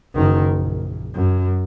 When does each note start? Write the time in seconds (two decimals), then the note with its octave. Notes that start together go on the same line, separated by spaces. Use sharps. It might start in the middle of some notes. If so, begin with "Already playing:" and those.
0.15 F#1 D#3
0.53 A#1
1.15 F#2